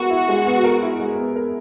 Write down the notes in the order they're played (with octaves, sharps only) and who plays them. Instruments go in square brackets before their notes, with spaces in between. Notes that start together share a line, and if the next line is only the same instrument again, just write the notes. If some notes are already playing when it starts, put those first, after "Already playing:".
Already playing: [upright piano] G#3 B3 E4 A#4 [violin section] F#4
[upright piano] E4
G#3
B3
A#4
E4
G#3
B3
A#4